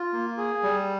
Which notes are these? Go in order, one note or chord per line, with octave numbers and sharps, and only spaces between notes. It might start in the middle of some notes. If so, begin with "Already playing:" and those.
Already playing: F4
A#3
G#4
G3